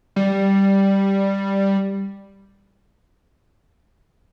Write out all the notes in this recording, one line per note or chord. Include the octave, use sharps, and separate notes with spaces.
G3